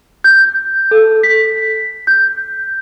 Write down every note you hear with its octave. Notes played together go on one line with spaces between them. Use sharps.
G6
A4
B6
G6